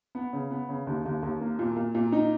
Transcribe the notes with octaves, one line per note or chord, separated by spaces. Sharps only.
B3
C#3
B3
C#3
D#2
D#2
D#2
A#3
A#2
A#2
A#2
D#4